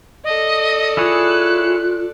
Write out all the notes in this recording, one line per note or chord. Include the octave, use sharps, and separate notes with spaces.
A4 D5 D#5
E4 F4 G#4 C#5 F#6